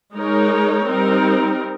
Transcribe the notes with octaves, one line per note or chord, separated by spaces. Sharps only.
G#3 D#4 A#4 C#5
G3 C4 D#4 A#4